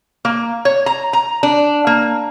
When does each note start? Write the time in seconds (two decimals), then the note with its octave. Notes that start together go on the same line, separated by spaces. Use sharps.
0.25 A#3
0.65 C#5
0.86 A#5
1.13 A#5
1.43 D4
1.87 A#3